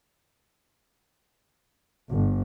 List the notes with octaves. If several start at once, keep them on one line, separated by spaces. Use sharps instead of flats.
G1